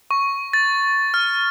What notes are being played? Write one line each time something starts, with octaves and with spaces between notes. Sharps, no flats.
C#6
A6
F6